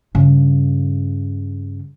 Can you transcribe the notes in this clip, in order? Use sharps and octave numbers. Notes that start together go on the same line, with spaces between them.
G2 C#3